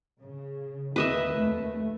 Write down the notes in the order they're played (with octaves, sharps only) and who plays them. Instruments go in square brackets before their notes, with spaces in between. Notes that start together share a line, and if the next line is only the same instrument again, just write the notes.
[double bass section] C#3
[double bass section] D#2 D#3 [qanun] B4 D#5 E5
[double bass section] F1 D#2 A3